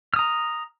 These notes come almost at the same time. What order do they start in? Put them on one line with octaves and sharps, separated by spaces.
F6 D#6 A#5